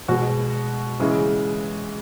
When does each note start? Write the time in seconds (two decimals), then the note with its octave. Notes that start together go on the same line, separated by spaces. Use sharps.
0.08 B2 G#3 F#4
1.00 C#3 E3 G#3